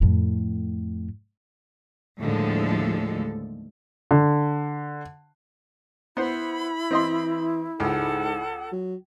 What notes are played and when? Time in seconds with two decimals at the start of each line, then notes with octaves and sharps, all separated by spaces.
0.01 F2 A2
2.21 D#2 A2 D3 F3 G#3 A4
4.11 D3
6.17 B3 E4 C5 B5
6.91 E3 C4 D#5 C6
7.80 C#2 G#2 A4 F#5
8.72 F#3